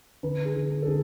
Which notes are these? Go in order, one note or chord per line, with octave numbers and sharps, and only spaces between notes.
D3 B4
G#4
D3
G#4
A4
D3 G#4